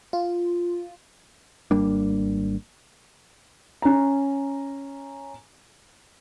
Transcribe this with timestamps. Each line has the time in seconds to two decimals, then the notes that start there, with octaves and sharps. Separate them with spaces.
0.13 F4
1.71 G#1 G3 A#3 D4
3.82 C#4 A#5